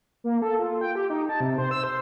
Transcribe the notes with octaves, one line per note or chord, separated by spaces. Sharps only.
A#3
A4
F4
G5
G4
D#4
A5
C3
C5
E6
C5